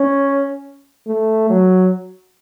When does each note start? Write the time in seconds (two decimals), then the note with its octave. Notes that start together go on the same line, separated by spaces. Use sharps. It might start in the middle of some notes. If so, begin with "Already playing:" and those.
Already playing: C#4
1.07 A3
1.50 F#3